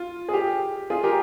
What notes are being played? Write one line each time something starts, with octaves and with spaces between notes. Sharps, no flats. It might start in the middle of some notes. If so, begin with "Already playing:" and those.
Already playing: F4
G#4
G4
F4 G#4
G4 A#4